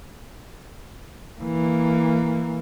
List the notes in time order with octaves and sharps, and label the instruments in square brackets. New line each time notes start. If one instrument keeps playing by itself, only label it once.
[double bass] E3 A#3